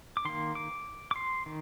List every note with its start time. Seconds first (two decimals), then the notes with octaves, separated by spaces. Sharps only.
0.17 D6
0.25 D#3 A#3 C6
0.55 D6
1.11 D6
1.16 C6
1.46 D#3